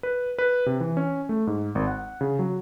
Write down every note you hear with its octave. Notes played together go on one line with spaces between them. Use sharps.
B4
B4
C3
E3
C#4
A3
G#2
G#1
F#5
C#3
F#3